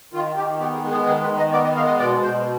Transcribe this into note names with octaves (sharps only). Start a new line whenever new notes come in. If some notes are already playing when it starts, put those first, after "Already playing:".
D#3 F4
D#3 G4
B3 G4
G#4
G#3
G#4
D#3 G#4
B4
D#3
D#5
B3 D5
D#5
G#3 F5
D#5
B2 D5
B2 C5